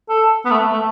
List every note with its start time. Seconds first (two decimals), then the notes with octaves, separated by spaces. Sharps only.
0.10 A4
0.46 B3
0.51 A3
0.72 A3